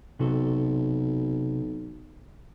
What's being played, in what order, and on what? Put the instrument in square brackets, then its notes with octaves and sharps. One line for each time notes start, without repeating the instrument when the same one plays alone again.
[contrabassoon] B1 [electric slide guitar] C3 F#4 A4